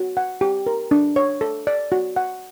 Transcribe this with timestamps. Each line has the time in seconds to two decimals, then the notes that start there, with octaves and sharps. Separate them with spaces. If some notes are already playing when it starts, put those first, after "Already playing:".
Already playing: F#4
0.17 F#5
0.41 G4
0.66 A#4
0.91 D4
1.16 C#5
1.41 A4
1.67 D5
1.92 F#4
2.16 F#5